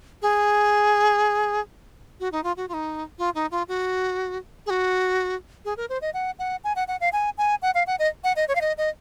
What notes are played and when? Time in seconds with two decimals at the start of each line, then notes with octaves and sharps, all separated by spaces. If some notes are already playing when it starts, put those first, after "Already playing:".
0.22 G#4
2.20 F#4
2.32 D#4
2.44 F4
2.57 F#4
2.69 F4
2.74 D#4
3.18 F4
3.35 D#4
3.51 F4
3.68 F#4
4.66 G#4
4.70 F#4
5.65 G#4
5.77 A#4
5.89 C5
6.01 D#5
6.14 F#5
6.39 F#5
6.64 G#5
6.76 F#5
6.88 F#5
7.00 F5
7.13 G#5
7.38 G#5
7.62 F#5
7.74 F5
7.87 F#5
7.99 D#5
8.24 F#5
8.36 D#5
8.48 C#5
8.55 F5
8.61 D#5
8.78 D#5